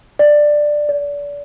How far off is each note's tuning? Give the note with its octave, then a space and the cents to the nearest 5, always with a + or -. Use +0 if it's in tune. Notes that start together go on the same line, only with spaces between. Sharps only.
D5 +10
D5 -30